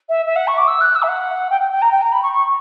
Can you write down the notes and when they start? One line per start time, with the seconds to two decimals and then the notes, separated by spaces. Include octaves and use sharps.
0.09 E5
0.26 E5
0.36 F#5
0.47 C#6
0.57 D6
0.67 E6
0.81 F#6
0.95 E6
1.03 E5
1.09 F#5
1.50 G5
1.61 G5
1.71 G5
1.82 A#5
1.91 G5
2.02 A#5
2.12 B5
2.22 C#6
2.33 C#6